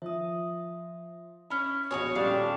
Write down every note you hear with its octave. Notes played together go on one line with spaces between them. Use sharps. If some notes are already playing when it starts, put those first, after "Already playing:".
F3 E5 D#6
C#4 E4 B5
A#1 B2 F#4 G#4 C#5 G#5 C#6 D#6
D#1 G3 D4 F5 G5 C6 C#6 F7